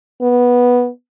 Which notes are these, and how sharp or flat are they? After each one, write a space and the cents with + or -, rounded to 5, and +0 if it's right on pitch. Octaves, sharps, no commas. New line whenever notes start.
B3 -10